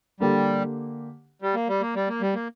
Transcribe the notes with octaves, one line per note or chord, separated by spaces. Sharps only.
D3 G3 A#3 G4
G3
A#3
G3
A#3
G3
A#3
G3
A#3